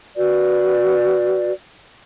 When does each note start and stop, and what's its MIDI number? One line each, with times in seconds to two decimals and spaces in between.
0.16 1.51 66
0.16 1.51 71
0.16 1.51 74